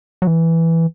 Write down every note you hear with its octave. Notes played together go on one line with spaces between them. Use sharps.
F#3
E3